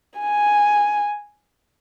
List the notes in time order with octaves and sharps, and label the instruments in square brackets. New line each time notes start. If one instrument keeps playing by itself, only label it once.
[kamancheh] G#5